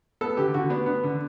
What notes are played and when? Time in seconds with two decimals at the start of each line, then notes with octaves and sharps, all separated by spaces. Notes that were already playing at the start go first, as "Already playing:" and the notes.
0.21 B3 A4
0.37 D3 G4
0.54 D3 F#4
0.70 B3 D4
0.86 B3
1.04 D3